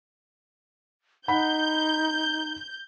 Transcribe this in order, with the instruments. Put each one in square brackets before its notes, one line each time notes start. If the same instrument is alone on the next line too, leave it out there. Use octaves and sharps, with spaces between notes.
[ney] D#4 [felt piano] F#5 B5 B6 [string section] G6